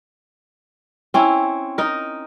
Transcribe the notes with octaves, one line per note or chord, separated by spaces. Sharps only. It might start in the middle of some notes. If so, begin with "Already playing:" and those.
C4 C#4 E4
D#4 A#4